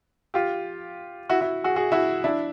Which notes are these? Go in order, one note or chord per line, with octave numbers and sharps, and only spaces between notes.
F4 G4
E4 F#4
E4 F#4
F#4 G#4
F#4 G#4
E4 F#4
D4 E4